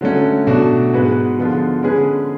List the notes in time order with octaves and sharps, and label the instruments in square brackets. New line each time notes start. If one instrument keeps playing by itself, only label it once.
[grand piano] D3 F#3 A3 C#4
B2 F#3 A3 D4 F#4
G#2 G#3 B3 F#4 B4
D3 F3 G#3 B3 F4
D3 G#3 C#4 G#4 B4